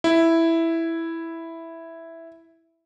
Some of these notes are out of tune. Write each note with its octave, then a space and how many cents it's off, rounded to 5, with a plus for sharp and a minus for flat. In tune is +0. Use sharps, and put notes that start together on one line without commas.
E4 +0